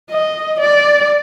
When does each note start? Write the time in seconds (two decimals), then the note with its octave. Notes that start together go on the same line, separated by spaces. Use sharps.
0.10 D#5
0.60 D5